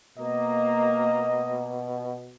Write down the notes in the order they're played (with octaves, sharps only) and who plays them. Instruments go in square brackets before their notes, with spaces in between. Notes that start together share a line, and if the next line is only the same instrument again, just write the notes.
[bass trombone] B2 [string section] A#3 [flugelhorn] D#5